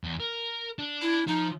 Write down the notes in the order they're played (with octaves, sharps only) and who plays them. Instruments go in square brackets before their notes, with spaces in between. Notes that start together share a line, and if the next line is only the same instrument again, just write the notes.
[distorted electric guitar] E2
A#4
D4
[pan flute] E4
[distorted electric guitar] F3 [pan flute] D#4